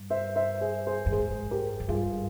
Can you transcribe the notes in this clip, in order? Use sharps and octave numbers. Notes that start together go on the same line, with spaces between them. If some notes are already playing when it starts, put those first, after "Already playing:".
Already playing: G2
C5 E5
C5 E5
G#4 C5
G#4 C5
G2
G#2 G#4 C5
G4 A#4
F2
G2 F4 G#4